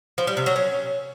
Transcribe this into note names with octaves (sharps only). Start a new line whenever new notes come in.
F3
G3
C3
F#3
C#4